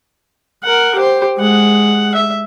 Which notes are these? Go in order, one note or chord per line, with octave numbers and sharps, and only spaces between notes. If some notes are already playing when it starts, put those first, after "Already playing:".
A#4 F#5
G4 C5
G#3 F#5
E5